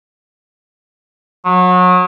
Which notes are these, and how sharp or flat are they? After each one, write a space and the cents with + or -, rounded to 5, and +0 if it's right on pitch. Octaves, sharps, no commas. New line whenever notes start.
F#3 -30